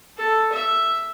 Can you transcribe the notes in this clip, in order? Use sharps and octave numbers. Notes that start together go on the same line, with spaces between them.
A4
E5